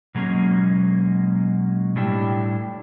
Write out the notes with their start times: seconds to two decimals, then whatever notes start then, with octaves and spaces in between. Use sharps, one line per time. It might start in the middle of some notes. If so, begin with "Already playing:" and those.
0.15 B2 F#3 G#3 A#3 C#4
1.96 A2 G3 D4 E4 G5